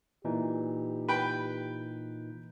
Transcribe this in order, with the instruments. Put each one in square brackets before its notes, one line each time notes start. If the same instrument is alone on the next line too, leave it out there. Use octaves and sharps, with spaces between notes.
[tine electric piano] A#2 E3 D#4 [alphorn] G4
[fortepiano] B4 G5